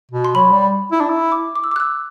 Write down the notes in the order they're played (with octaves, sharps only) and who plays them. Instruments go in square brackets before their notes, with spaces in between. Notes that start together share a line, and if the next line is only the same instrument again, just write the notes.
[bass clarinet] B2
[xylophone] C6
[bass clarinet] F#3 [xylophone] B5
[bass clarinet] G3
E4
D4
E4
[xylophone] D6
D6
E6
D6
F#6
E6